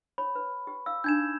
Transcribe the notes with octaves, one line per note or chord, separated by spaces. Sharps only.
C#5 B5
B4
G4
F5 E6
D4 D#4 G#5 G6 G#6 E7